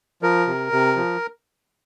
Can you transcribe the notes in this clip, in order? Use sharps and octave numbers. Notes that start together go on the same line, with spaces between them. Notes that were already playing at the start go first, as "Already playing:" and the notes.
F3 A#4
C3
C3
F3